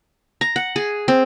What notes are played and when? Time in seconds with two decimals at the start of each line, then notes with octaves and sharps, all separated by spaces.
0.41 A#5
0.56 F#5
0.76 G#4
1.08 C4